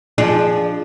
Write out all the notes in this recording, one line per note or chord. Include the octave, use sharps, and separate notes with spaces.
F3 D4 G#4